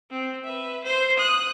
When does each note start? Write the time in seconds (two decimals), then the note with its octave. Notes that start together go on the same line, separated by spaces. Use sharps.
0.10 C4
0.44 B4 E5
0.84 C5 C6
1.18 D#6 F#6